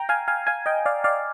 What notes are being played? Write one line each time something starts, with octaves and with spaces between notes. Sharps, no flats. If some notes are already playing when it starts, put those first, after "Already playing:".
Already playing: G5 A#5
F5 G#5
F5 G#5
F5 G#5
D#5 G5
D5 F5
D5 F5